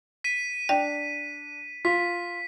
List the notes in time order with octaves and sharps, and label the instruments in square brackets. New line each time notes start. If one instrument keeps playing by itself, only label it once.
[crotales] B6 D#7
[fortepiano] D4 [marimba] G5
[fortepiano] F4 [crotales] B6